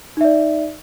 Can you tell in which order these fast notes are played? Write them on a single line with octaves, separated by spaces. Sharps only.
D#4 E5 D5